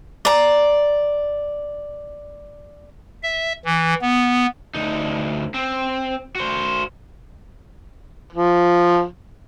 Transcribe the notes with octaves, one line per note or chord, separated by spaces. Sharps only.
D5 A#5
E5
E3
B3
D2 D#4
C4
F#4 C5
F3